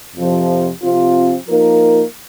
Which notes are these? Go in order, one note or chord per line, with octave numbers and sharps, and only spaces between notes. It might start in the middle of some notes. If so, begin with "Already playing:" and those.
F2 C3 F3
C3 F3 C4 F4
F3 A#3 D#4 A#4